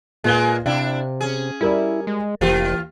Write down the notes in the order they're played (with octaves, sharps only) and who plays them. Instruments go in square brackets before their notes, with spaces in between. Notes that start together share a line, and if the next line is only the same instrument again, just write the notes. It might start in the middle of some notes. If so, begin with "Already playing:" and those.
[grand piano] A#2 B4 G7 [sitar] G#3 A#3 G#4
[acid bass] C3 [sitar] D4 E4 [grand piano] F5 G5
[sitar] C#4 G#4
[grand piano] G3 A#4 D5 [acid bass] E4
[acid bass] G#3
[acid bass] F1 [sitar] E3 F4 [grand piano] A#3 G4